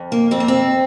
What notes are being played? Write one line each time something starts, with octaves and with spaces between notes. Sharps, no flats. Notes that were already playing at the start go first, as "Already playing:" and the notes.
Already playing: F2
A#3
F2 C4
A#3
C4